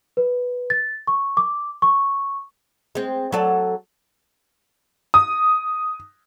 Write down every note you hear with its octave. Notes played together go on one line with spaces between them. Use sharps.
B4
A6
C#6
D6
C#6
G#3 C4
F#3 A4 D5
D#6